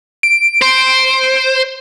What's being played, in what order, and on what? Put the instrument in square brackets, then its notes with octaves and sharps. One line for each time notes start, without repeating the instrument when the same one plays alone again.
[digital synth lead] D7
[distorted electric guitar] C5